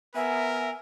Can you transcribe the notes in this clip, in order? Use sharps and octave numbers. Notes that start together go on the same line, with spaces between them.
B3 A#4 E5 G#5